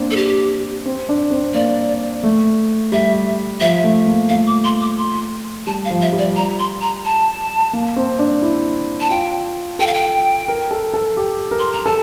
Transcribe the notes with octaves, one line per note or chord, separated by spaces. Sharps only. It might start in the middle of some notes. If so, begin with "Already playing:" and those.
Already playing: A#3 C4 D4
A4
G4
C4
D4
C4
A#3 D5
A3
G3 E5
F3 E5
A3
A#3
A3 F5
D6
C6
D6
C6
G3 A5
F5
F3
E5
G3
D5
A#5
C6
A#5
A5
A#3
C4
D4
E4
A5
F4 G5
A4 G5
F5
G5
A#4
A4
A4
G4
A#4
C6
A#5
A4 A5